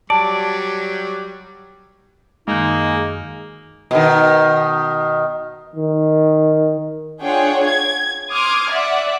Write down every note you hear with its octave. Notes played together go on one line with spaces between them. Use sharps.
F#3 G3 D5 A5
F#2 D#3 G#3 A#3 D#4
B2 D#3
D#3
D4 F4 G#4 C#5 F#5 G5
G#6
C6 D6 D#6 F6 G#6
D5 E5 F#5